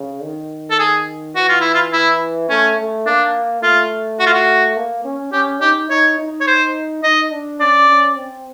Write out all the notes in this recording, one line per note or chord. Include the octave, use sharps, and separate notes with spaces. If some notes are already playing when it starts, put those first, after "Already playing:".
Already playing: C#3
D#3
A4
G#4
E3 F#4
F4
E4
F4
E4
A3 C#4
A3
A#3 D4
A3 F4
F#4
F4
F#4
A#3
C#4
C#4 G4
D#4 G4
D#4 C#5
D#4
C#5
C5
D#4 D#5
D4
C#4 D5
C#4
C4